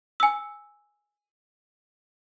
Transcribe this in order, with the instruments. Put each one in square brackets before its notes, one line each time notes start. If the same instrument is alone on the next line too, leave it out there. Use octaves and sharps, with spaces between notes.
[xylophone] G#5 E6